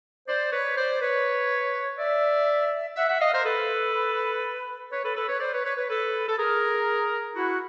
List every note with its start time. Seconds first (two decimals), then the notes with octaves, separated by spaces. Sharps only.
0.28 C5 D5
0.53 B4 C#5
0.77 C5 D5
1.01 B4 C#5
1.99 D5 E5
2.96 E5 F#5
3.09 E5 F#5
3.21 D#5 F5
3.33 A#4 C5
3.45 A4 B4
4.92 B4 C#5
5.04 A4 B4
5.16 A4 B4
5.29 B4 C#5
5.40 C5 D5
5.53 B4 C#5
5.65 B4 C#5
5.77 B4 C#5
5.89 A4 B4
6.28 A4
6.38 G#4 A#4
7.35 E4 F#4